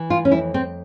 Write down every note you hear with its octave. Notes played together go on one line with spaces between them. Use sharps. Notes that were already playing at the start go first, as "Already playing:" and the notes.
Already playing: E3
F4
C#4
F2 E4
C4